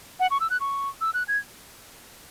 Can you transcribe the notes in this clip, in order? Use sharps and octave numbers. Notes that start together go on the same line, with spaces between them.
F#5
C#6
E6
F#6
C#6
E6
F#6
G#6